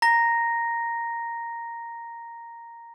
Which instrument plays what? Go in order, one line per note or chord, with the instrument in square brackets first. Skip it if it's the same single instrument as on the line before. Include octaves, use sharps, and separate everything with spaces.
[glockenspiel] A#5 A#6